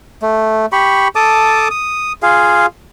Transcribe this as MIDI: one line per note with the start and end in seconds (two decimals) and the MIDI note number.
0.22 0.66 57
0.72 1.08 67
0.72 1.08 83
0.72 1.08 85
1.15 1.68 69
1.15 1.68 81
1.15 1.68 86
1.15 1.68 87
1.71 2.13 87
2.23 2.66 65
2.23 2.66 68
2.23 2.66 77